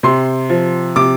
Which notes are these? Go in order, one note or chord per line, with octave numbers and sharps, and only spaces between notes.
C3 C6
F3
C3 D6